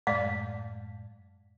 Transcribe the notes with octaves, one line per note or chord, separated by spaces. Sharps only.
F#2 A2 G#3 D5 F5